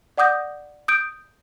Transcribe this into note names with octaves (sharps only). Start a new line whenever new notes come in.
D5 F#5 D6 D#6 G6 A#6
D#6 G6 D7